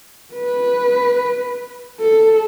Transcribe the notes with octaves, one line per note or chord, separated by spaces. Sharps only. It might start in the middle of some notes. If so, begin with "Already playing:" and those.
B4
A4